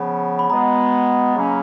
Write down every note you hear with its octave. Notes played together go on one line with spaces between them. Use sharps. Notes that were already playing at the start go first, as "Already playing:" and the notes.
Already playing: C#3 F3 B3 B5
B5
B2 G#3 B3 A#5
C#3 F#3 A#3 C#4